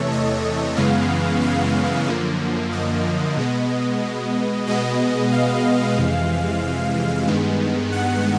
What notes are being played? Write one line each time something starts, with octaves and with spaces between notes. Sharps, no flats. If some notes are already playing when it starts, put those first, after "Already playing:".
Already playing: E2 C3 E3 A3 A4 C#5
D#5
F#2 C#3 E3 G#3 B3 F5
F5
F#2 D3 F3 A#3
D#5
B2 G#3 B3
B2 G#3 B3 D#5
F5
F2 C3 E3 G#3
G2 D#3 G#3 B3
F#5